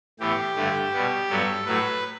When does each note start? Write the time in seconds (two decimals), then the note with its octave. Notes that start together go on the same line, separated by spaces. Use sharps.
0.20 A2 E3 B3 G4
0.56 G2 D3 A3
0.93 B2 G3 B3
1.29 G2 F#3 B3 A4
1.65 A2 F#3 A3 B4